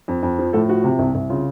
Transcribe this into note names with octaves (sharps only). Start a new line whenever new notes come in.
F2
F2
F3
A2 A4
F3 F#4
C3
C2
C2
C#3 F4